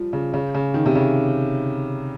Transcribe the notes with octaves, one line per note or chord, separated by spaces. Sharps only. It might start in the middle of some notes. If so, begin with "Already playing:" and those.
Already playing: F3 G3
C#3
C#3
C#3
D#3
C3
C#3